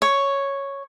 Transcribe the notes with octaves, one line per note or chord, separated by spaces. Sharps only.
C#5